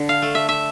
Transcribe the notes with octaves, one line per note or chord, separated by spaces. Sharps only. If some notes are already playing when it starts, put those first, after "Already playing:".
Already playing: D3
F5
A3
E5
E5